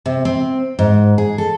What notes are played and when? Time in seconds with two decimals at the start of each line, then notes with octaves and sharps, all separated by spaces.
0.06 C3
0.25 C4
0.79 G#2
1.18 G#4
1.38 A4